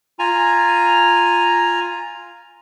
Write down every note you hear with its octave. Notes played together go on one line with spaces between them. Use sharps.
F4 G#5 A#5